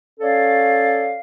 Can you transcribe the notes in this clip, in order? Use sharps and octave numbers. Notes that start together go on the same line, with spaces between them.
C#4 A4 C#5 D5 F5